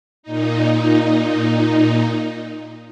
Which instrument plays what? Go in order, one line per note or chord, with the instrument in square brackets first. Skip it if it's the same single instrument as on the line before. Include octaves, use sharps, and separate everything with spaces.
[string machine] A#2 D#4